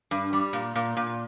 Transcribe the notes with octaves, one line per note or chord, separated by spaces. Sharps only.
G2
G3
A#2
A#2
A#2